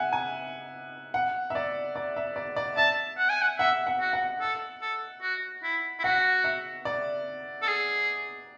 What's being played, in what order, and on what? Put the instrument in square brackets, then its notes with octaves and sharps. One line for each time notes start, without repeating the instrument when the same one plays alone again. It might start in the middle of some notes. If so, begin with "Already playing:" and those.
Already playing: [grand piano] E5 F#5 G#5
G#5
F#5
E5
D5
D5
E5
D5
D5
[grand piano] E5 [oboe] A5
[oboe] F#5
G#5
F#5
[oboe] E5 [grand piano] F#5
[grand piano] F#5
[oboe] F#4
[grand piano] F#5
[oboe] A4
A4
F#4
E4
E4
[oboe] F#4 [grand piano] F#5
[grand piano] E5
D5
[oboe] A4
G#4